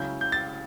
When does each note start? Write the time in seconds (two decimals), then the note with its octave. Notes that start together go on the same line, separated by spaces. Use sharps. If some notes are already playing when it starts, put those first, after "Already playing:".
Already playing: C#2 C#3 F#3 C#4 E4 G6
0.21 G6
0.32 A6